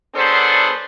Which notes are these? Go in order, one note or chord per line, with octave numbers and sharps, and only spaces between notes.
F#3 B3 D4 G#4 A4 C5